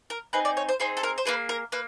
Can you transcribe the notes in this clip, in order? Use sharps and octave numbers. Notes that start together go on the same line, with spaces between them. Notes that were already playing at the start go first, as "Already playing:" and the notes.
A#4
C4 D#4 G#4 B4
D5
C#5
C5
C4 D#4 G#4 C5
A4
A#4
C5
A#3 D#4 G#4 B4
A#4
A#3 B4